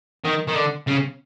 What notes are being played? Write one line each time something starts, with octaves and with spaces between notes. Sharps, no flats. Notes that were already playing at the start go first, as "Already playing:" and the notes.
D#3
D#3
D3
C#3